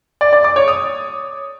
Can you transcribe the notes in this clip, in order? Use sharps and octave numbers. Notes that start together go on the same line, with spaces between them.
D5
D5
D6
C#5
D#6